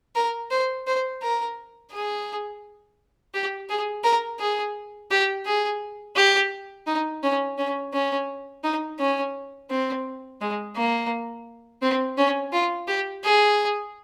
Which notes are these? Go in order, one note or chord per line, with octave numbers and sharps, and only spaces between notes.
A#4
C5
C5
A#4
G#4
G4
G#4
A#4
G#4
G4
G#4
G4
D#4
C#4
C#4
C#4
D#4
C#4
C4
G#3
A#3
C4
C#4
F4
G4
G#4